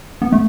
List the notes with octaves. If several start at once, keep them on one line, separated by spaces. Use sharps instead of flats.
B3
A3